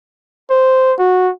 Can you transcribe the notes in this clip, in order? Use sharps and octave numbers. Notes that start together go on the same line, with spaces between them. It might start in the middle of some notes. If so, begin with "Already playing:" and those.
C5
F#4